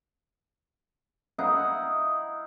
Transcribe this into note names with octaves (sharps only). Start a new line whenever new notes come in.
D#4 E4 F5 F#5